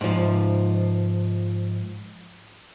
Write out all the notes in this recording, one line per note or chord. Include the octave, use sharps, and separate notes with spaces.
G#2 F3